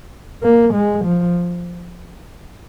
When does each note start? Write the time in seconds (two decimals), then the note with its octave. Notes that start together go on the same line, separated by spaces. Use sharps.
0.43 A#3
0.74 G#3
1.05 F3